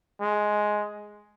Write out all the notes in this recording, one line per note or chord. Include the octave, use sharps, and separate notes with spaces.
G#3